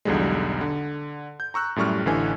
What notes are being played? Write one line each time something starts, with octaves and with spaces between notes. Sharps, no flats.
B1 E2 B2 D3 G3 G#3
D3
G6
A#5 C#6 E6 F#6
F#2 A2 G3 C#6 F6
A1 D3 E3 G#5